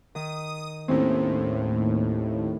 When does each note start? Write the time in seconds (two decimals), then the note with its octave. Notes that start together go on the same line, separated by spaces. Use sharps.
0.15 D#3 D#6
0.88 D#2 A2 C4 C#4 D#4